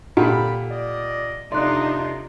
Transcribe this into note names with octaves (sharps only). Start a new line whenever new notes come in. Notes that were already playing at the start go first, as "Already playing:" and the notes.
A#2 D3 G4 A4 F#5 B5
D5 D#5
F2 C3 D4 D#4 F4 D5 C6 F#6